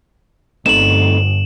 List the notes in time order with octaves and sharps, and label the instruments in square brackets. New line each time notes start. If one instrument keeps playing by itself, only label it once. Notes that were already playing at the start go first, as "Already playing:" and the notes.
[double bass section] G1 [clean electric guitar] A3 C4 D#4 [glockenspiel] E7 F#7